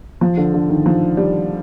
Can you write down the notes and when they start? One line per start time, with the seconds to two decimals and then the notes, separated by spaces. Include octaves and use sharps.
0.21 F3
0.37 D3
0.54 D3
0.69 D#3
0.86 F3
1.17 G3